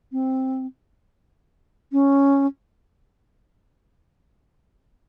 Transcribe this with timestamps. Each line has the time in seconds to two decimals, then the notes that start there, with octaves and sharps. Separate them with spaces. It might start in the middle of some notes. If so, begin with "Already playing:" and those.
0.12 C4
1.92 C#4